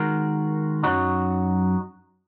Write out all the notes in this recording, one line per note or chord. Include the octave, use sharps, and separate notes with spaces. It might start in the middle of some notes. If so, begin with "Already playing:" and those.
Already playing: D#3 G#3 F#4 A#4
F#2 F#3 D#4 F#4